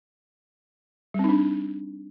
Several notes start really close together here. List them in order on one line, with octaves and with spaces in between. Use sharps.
G3 C4 D#4 D4